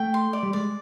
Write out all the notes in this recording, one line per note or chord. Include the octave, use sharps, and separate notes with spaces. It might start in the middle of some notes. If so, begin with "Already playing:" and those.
Already playing: A3 G5
C6
D5
G3
G#3 D5